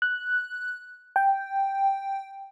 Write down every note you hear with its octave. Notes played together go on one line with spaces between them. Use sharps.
F#6
G5